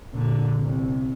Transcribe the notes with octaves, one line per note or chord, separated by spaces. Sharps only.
A#2 D3
C2 C3